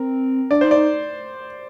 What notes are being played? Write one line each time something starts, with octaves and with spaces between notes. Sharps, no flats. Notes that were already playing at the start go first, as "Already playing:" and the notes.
Already playing: C4 A#4
D4 D5
D#4 C5
D5
D#4